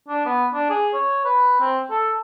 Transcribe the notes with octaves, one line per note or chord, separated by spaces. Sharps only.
D4
B3
D4
G#4
C#5
B4
C4
A4